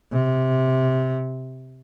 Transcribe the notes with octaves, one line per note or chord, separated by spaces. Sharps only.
C3